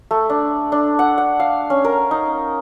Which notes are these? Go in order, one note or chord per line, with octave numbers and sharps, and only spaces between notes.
A3
D4
D4
F#5
F#5
F5
C#4
A#4
D#4